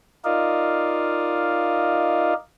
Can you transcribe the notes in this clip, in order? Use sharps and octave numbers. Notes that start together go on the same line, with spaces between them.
D#4 F4 A#4 D5 D#5 F5